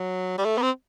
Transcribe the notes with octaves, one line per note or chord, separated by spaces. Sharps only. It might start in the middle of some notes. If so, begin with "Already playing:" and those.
Already playing: F#3
G3
A3
B3
C4